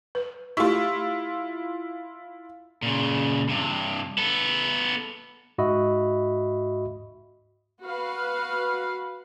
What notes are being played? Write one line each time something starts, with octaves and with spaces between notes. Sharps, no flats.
B4
A3 E4 F4 G4 C#6
A#2 C#3
G2 C3
B3 A4
G#2 F#4 D#5 E5 B5
F#4 B4 F5